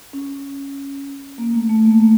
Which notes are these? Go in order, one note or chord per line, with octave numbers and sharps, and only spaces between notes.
C#4
A#3
A3
A3
A#3
A3